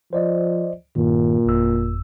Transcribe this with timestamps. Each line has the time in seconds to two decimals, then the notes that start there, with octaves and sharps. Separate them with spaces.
0.13 F3 C5 D5 D#5
0.96 G2 A#2 D#3
1.46 G1 F2 E6